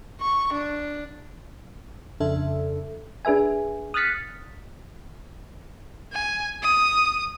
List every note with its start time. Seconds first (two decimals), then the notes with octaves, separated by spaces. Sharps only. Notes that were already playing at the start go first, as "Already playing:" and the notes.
0.21 C#6
0.53 D4
2.20 F2 C#3 D4 A4 E5
3.25 D4 G#4 B4 E5 G#5
3.94 D#6 F6 F#6 A6 B6 C#7
6.12 G#5
6.63 D#6